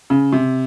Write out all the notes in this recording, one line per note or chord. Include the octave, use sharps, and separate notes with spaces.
C#3
C3